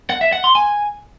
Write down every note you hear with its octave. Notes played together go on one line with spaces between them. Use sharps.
F#5
E5
F#5
C6
G#5